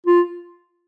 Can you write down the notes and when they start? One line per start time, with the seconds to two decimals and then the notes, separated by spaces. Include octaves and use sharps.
0.06 F4